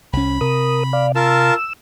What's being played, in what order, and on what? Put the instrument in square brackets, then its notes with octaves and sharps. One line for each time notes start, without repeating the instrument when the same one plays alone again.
[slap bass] C2 C#4 [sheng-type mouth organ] B5
[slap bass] C3 [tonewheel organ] A#4 D#6
[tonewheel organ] D5 F5
[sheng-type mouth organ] F4 A#4 A5 [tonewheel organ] E6